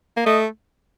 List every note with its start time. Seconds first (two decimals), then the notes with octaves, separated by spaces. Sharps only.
0.17 A#3
0.26 A3 D#5